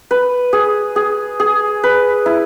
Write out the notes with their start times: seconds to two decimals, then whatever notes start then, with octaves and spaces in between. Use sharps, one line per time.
0.11 B4
0.53 G#4
0.96 G#4
1.40 G#4
1.83 B4
2.26 E4